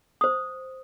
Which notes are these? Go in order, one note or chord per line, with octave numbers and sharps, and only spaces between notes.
C5 D#6